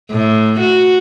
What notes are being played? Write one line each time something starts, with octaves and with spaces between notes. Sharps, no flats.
A2
F#4